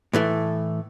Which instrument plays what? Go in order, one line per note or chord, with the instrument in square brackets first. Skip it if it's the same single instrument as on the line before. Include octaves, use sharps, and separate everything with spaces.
[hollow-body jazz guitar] A2 E3 A3